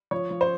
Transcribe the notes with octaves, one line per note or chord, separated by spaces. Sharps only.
F3 C#5
F3
C5